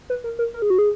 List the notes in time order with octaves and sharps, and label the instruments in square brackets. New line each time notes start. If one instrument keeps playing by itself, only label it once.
[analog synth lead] B4
A#4
A#4
A#4
G#4
F#4
G#4